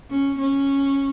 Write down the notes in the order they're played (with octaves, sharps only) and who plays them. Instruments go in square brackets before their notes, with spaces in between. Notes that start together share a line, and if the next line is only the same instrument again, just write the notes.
[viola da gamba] C#4
C#4